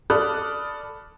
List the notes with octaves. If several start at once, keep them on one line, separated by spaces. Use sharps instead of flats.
A4 D5 B5 D#6 F6 F#6